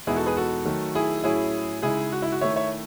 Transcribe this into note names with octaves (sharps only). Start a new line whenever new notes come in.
E2 B2 G#3 B3 D#4 E4 G#4
F#4 A4
G#4 B4
F#4 A4
D#3 F#3 A3
E4 G#4
A2 F#3 C#4 E4 G#4
C#3 G#3 D#4 E4 G#4
F#4
E4
F#4
D#3 A3 E4 C#5 E5
C#5 E5